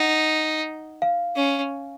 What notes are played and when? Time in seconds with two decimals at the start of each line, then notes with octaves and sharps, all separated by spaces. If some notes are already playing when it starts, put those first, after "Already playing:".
Already playing: D#4 F#5
1.02 F5
1.36 C#4